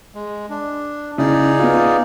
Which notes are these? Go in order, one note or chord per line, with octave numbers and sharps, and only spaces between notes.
G#3
D4
C#3 D#4 E4 G#4 D5
B3 F4